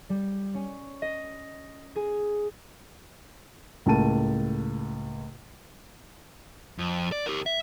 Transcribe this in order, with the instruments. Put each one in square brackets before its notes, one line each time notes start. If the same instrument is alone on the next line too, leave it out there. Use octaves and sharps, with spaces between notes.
[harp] G3
C#4
D#5
G#4
[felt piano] C#2 A2 A#3 A5 D#7
[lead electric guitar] F2
D5
G4 A#4
E5